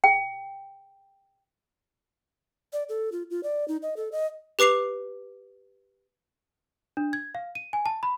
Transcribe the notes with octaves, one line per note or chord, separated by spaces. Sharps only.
G5
D5
A4
F4
F4
D5
D#4
D#5
A4
D#5
G4 B4 D6 C7 F7
D4
G#6
F5
D#7
G#5
A5
B5